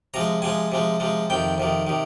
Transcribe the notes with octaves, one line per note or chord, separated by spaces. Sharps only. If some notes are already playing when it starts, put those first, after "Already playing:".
C3 F3 G#3 A#5
C3 F3 G#3 G#5
C3 F3 G#3
C3 F3 G#3
F2 C3 D#3 G5
F2 C3 D#3
C3 D#3